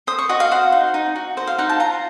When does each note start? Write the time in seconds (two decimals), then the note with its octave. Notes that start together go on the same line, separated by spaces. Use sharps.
0.07 C5 D#6
0.18 C#6
0.29 F#4 D#5
0.40 F5
0.51 C5 F#5
0.72 D#4
0.94 D#4
1.16 F#4
1.37 C5 D#5
1.47 F5
1.58 D#4 F#5
1.69 A5
1.80 F4 A#5